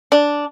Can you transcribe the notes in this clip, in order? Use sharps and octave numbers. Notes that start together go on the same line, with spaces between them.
D4